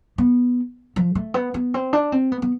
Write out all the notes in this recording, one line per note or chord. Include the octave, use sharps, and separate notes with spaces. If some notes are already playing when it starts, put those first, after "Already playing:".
B3
F3
A3
B3
B3
C4
D4
C4
B3
B3